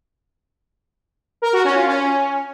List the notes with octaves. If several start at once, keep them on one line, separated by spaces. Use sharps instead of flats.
A#4
F#4
C#4
F4
C#4